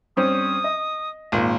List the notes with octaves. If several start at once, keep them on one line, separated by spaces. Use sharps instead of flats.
G2 C4 C#4 D#6
D#5
G#1 A#2